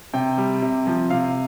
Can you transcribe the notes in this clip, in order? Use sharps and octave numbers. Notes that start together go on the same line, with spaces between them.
C3 G5
G3
C3
F3
C3 F5